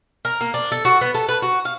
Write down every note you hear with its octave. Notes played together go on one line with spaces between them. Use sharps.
A#4
A#3
D4
A4
F#4
B3
A4
B4
F#4
F5